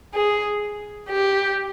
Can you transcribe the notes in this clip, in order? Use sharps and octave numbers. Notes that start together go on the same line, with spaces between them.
G#4
G4